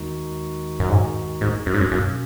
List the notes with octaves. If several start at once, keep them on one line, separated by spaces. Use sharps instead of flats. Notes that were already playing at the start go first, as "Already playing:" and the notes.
Already playing: D#2 D#3 G#3 D#4 F#4
F#2
G#2
G#2
F#2
G#2
F#2
F#2 B2 A#3 C#4